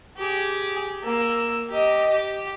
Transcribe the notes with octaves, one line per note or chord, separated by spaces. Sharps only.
G4 G#4
A#3 E6
G4 D#5
G4